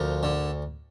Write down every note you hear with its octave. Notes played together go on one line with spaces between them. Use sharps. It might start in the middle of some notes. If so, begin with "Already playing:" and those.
Already playing: D2 F3 A#4
D3